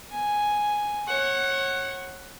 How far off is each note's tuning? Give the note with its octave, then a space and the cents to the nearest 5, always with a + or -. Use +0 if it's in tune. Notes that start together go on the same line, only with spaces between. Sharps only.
B3 +25 G#5 +0
C#5 -25 F#5 +10